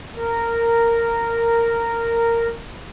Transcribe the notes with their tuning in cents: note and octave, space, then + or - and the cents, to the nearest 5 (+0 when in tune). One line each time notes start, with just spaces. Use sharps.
A#4 -10